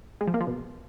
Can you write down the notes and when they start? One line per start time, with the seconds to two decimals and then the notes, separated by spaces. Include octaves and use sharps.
0.21 G#3
0.27 F3
0.34 A#3
0.41 F3
0.47 B2